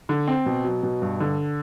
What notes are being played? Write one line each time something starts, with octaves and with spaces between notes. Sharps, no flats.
D3
C4
B2
F#3
B2
G2
D3